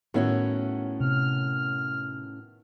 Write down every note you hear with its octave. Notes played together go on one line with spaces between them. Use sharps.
A2 D#3 B3 C#4 E4 F#4
C3 F6